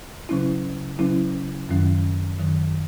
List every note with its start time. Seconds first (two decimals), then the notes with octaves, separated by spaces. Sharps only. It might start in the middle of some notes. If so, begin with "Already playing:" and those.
0.29 C#3 F#3 C#4 E4
0.99 C#3 F#3 C#4 E4
1.69 F#2 D#3 F#3 C#4
2.38 F#2 D#3 F#3 C#4